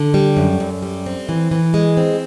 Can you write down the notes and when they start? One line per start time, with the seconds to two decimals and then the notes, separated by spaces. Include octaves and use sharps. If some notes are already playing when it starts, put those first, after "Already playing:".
Already playing: D3
0.14 G3
0.37 F#2
0.60 F#2
0.82 G3
1.06 C4
1.29 E3
1.51 E3
1.74 G#3
1.97 C4